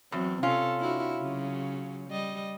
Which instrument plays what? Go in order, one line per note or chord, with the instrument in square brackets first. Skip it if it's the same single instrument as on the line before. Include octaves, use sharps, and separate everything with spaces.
[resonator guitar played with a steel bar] E2 [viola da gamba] F#3 C4
[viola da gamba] C3 A4 [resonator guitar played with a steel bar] C#4 F4
[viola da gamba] D4 E4 F#4
C#3 F#3
G3 D#5